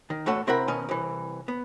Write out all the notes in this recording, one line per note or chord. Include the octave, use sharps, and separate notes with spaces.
D#3
E2 A2 A3 F#4 A4 F#5
C3 C4 E4 A#4 F#5 B5
B2 D#3 C#4 D#5
C2 E3
B3